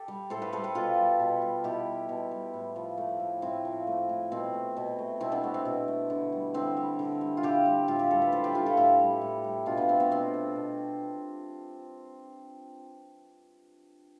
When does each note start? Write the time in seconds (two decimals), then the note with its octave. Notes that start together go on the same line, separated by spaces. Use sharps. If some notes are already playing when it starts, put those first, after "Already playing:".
Already playing: G4 A4
0.08 G3
0.30 A2 A4 C5
0.42 G4 B4
0.53 G3 A4 C5
0.64 G4 B4
0.75 B2 F4 A4
0.97 G3
1.20 B2
1.42 G3
1.64 B2 E4 G4
1.87 G3
2.09 B2
2.31 G3
2.54 A2
2.76 F3
2.98 A3
3.20 A2
3.42 A2 C4 E4
3.65 F3
3.87 A3
4.09 A2
4.32 B2 C4
4.54 A3
4.77 B2
4.99 A3
5.20 B2 C4 E4
5.32 B3 D4
5.43 A3 B3
5.54 C4
5.65 B2
5.88 A3
6.10 D3
6.32 G3
6.54 D3 C4 E4
6.77 G3
6.99 D3
7.21 G3
7.37 F4
7.43 D3 E4 G4
7.65 G3
7.88 A2 F4
7.99 G4
8.10 G3 A4
8.22 B4
8.32 A2 A4 C5
8.44 G4 B4
8.54 G3 F4 A4
8.66 F4 A4
8.77 A2 E4 G4
8.99 G3
9.22 A2
9.44 G3
9.66 B2 D4 F4
9.77 B3 D4
9.88 A3 C4
10.00 B3
10.10 B2 C4
10.34 A3
10.56 B2